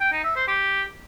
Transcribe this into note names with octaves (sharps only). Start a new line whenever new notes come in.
G5
D#4
E5
C5
G4